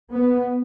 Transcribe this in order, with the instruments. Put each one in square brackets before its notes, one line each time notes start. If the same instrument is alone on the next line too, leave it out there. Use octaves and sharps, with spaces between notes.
[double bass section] B3